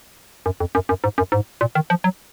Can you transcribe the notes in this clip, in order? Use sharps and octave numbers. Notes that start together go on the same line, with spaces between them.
F#2
F2
F#2
F#2
G#2
F#2
G#2
A#2
D#3
F3
F#3